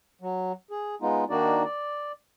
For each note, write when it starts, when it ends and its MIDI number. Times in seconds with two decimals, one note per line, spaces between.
0.21 0.52 54
0.71 0.95 68
1.02 1.24 56
1.02 1.24 59
1.02 1.24 63
1.02 1.24 65
1.30 1.64 51
1.30 1.64 58
1.30 1.64 62
1.30 1.64 63
1.30 1.64 66
1.30 1.64 74
1.64 2.12 74